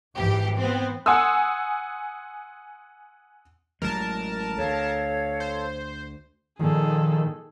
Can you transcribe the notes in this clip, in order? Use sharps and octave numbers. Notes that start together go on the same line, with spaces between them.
G#1 E3 G4
B3 C4
F#5 G#5 C6 D#6 E6
A1 F#3 G#3 A#4 A5
D2 A4 C#5 F5
C5
A#2 D#3 F3 G#4 A4